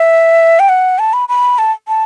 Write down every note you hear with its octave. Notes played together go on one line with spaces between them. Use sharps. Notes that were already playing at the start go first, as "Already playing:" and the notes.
Already playing: E5
G5
F#5
A5
B5
B5
A5
A5